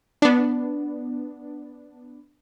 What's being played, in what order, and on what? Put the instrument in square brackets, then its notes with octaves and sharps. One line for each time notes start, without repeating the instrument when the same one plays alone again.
[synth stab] B3 D4